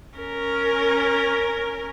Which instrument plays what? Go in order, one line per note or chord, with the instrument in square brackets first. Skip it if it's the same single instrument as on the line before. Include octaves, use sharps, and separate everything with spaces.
[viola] C#4 A#4